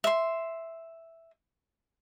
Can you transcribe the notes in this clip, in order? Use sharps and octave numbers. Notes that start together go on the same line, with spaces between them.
E5 C6